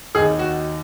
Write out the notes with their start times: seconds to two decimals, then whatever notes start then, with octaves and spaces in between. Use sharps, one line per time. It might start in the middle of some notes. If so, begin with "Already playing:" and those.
0.15 D#2 D#3 G#4
0.39 F#4